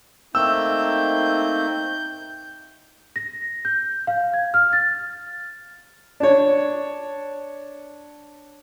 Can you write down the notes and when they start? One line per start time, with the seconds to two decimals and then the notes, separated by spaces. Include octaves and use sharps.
0.35 A3 A#3 C4 D#4 E6 G6
3.16 A#6
3.65 G6
4.07 F5
4.34 G#6
4.54 F6
4.73 A6
6.20 D4 C#5